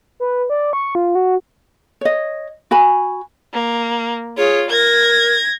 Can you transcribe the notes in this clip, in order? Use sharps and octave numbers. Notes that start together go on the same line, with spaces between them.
B4
D5
C#6
F4
F#4
C#5 D#5
F#4 G#5 B5
A#3
F4 G#4 C#5
A#4 G#6 A#6